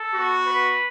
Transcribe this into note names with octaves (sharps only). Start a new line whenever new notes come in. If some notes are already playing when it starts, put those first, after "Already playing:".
Already playing: A4
B3 F#4
B4